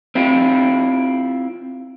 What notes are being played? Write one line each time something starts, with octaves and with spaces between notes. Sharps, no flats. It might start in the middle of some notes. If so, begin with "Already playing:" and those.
C4 E4 F4 G4